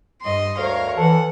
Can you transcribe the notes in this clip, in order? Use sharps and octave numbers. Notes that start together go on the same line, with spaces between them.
G2 D#5 C6
D2 A#4 C#5 F5
E3 A4 F#5